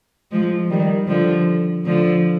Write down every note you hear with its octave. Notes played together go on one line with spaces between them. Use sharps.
F3 G#3
D#3 G3
D3 F3
D3 F3